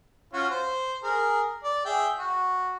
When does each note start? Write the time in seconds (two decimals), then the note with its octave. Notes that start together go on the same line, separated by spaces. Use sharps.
0.33 C#4 F4 F#4
0.50 C5
1.03 G#4 A#4
1.64 D5
1.85 G#4 E5 G5
2.19 F#4